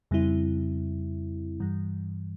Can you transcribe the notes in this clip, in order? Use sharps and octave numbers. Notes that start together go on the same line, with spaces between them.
F2 C#3 G3 C4 E4
G2 E3 G3